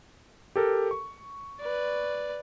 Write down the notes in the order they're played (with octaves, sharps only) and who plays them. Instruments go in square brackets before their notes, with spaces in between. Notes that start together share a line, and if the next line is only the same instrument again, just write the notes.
[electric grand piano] G4 A4 A#4
C#6
[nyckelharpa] B4 D5